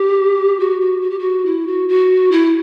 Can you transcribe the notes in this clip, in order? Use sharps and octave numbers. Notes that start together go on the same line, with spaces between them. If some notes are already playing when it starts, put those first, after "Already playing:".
Already playing: G4
F#4
F#4
F#4
G4
F#4
E4
F#4
F#4
E4